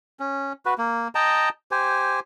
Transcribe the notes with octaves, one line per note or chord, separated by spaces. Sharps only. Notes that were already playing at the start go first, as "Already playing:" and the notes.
C#4
F#4 B4
A#3
D#5 G5 A5 A#5
G4 C5 G#5